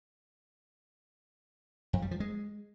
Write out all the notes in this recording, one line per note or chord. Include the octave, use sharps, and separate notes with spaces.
F2
G3
F3
G#3